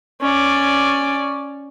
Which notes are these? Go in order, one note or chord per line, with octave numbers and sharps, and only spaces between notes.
C#4 D5